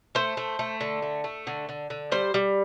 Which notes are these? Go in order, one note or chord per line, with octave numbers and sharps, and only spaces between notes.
A3 C5
A3
A3
D3
A3
A3
D3
D3
D3
G3 C5
G3